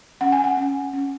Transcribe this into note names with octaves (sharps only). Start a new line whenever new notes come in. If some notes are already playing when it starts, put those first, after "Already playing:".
C#4 F#5
G#5
F#5
C#4
C#4